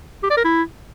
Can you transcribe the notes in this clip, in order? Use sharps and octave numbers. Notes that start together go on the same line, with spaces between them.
G4
D5
A#4
E4